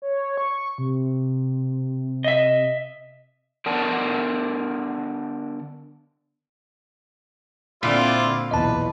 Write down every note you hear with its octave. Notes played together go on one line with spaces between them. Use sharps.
C#5
C#6
C3
D#5 E5
D3 B3 A#4 D5 F#5 A5
A#2 D3 C4 E4 F4 D5
B1 E2 B4 D#5 A5